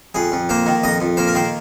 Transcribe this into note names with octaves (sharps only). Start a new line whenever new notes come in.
F2 G#4
F2
A#3 C5
D#3
F2 D#5
F2
A#3 C5
A#4
D#3 C5